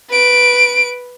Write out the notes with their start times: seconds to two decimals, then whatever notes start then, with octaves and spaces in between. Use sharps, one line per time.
0.10 B4 D7